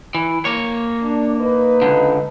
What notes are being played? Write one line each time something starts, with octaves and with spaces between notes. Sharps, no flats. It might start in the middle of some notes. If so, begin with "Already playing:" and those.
E3
A#3 C#5
D4
D#4 B4
C#2 D3